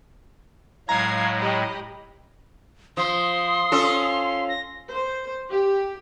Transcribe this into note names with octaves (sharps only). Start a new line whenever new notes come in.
A2 F#3 G#3 F5 A#5 G#6 C7
G4 D#5 B5
F3 C6 D#6
C#4 F4 A4
A#6
C5
G4